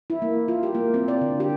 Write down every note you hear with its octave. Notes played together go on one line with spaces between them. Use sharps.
E4
A#3
F4
G4
A#3
C4
D5
D3
G4